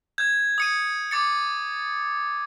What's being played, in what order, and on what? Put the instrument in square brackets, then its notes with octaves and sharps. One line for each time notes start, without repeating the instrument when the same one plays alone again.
[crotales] G6 G#6
D#6 C#7 D#7
D6 A6 C#7